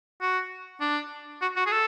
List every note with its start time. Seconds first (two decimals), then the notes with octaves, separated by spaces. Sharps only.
0.21 F#4
0.81 D4
1.42 F#4
1.57 F#4
1.66 G#4
1.72 A4